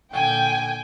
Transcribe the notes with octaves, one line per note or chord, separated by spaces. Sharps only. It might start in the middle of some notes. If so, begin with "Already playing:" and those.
A#2 D3 G5 G#5